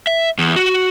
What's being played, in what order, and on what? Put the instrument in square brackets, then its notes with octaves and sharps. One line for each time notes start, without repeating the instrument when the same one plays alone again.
[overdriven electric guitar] E5
E2
F#4